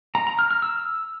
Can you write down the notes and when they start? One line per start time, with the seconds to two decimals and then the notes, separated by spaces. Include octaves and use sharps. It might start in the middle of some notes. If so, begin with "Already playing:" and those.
0.15 A#5
0.27 A#5
0.39 F6
0.51 F6
0.62 E6